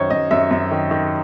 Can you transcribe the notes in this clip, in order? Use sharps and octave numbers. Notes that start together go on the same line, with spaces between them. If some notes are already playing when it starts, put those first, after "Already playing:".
Already playing: F#2 D#3 C5 C#5
F#2 D#5
F#2 E5
F#2
D#3
D#3